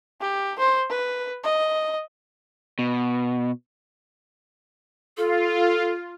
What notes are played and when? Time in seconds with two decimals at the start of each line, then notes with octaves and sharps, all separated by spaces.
0.21 G4
0.59 C5
0.90 B4
1.44 D#5
2.79 B2
5.17 F4 A4